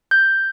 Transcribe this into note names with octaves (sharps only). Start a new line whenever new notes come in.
G6